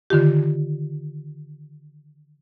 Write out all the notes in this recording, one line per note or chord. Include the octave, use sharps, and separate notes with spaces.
D3 D#3 F4 G4